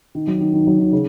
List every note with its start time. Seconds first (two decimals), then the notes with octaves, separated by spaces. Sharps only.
0.15 D#3
0.27 F#3
0.41 D#3
0.53 D#3
0.67 F#3
0.79 D#3
0.92 C#3